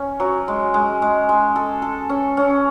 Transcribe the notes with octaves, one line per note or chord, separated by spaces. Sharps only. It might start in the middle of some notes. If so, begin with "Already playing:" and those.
Already playing: C#4
F#3
G#3
G#3
G#3
G#3
A4
A4
C#4
C#4